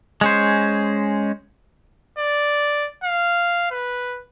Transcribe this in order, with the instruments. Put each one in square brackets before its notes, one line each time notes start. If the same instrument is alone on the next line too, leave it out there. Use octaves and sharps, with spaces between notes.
[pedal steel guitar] G#3 C#4 C5
[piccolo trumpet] D5
F5
B4